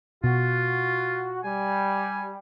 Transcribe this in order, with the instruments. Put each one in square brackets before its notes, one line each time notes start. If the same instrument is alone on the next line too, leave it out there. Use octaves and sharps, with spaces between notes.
[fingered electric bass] B2 [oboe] F4 [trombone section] F#4
[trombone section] G3 [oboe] G#5